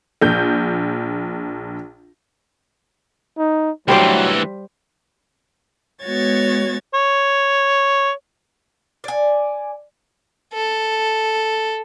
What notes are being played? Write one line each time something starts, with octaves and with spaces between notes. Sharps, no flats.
A#1 G6
D#4
D2 E3 F#3 G3 C5 D5
G#3 B3 F#4 C#5 G#6 A6
C#5
D5 G#5
A4